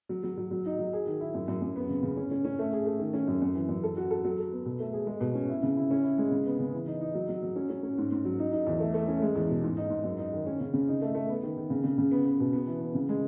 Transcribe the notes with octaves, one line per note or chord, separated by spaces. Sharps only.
F#3
F#3
F#3
F#3
D#4
F#3
G#4
D#3
E4
F#2
F#2
F#2
B3
C#3
C#3
C#4
C#4
C#4
A3
G#4
A3
D#3
C#4
F#2
F#2
E3
F#2
A4
F#4
A4
F#3
A4
B3
B2
A3
G#4
G#3
B2
C#4
E4
C#3
E4
C#4
E4
G#3
C#3
B3
C#3
E3
D#4
D#4
F#3
F#3
F#3
C#4
C#4
C#4
G#2
G#2
F#3
D#4
D#4
E2
A3
A3
C#4
G#3
E2
B2
G#2
D#4
G#2
F#2
D#4
D#3
C#4
C#3
C#3
D#4
A3
A3
B3
D#3
D#3
C#3
C#3
C#3
B3
B3
B2
B3
E3
B3
C#3
G#3